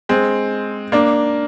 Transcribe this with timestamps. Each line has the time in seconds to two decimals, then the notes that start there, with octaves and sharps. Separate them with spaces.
0.09 G#3 C4
0.92 A#3 D4